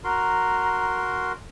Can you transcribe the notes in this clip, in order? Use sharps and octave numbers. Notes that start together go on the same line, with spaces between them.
F#4 A#4 A#5 C6